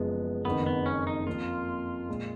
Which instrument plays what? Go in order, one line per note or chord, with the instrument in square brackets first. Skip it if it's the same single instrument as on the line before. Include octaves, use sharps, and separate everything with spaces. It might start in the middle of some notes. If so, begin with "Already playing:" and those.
Already playing: [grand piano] F#1 F#2 F3 G#3 [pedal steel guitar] B3
[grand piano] F#1 F2 D#3 [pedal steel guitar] B3
[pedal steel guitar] B3
C#4
D#4
[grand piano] F2 F3 A#3 [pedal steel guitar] F4
[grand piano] A#2 G#3